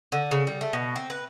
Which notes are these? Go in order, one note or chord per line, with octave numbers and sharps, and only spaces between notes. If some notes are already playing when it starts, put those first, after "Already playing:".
D3
C#3
G3
A3
B2
C4
B4